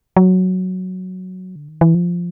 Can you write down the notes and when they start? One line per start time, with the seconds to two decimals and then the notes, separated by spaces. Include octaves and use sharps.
0.16 F#3
1.56 D3
1.69 D#3
1.81 E3
1.95 F3